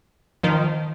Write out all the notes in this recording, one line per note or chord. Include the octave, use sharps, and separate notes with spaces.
D#3 F3